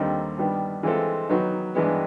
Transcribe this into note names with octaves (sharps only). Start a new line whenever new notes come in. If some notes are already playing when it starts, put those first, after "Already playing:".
Already playing: D#2 D3 G3 C4 D#4
G2 D#3 G3 B3
E3 G#3 C4 F4 A4
D#3 F#3 B3 D#4
G2 E3 G#3 B3